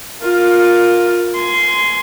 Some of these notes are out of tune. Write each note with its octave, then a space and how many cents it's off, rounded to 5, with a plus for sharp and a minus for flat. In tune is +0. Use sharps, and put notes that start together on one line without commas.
F4 +15 A#4 +0
G#5 +15 C6 -10